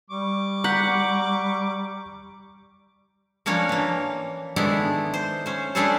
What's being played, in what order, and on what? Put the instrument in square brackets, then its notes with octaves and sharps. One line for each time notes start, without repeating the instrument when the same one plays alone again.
[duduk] G3 [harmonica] C#6 D6
[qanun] F#5 [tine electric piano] A#5 G6 B6
[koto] F3 A#3 C#4 D4 C#5
E3 A#3
D#3 G#3 A3 B3 D4 E4
C5
C#4 C5
C#4 D4 E4 G#4 A4 C5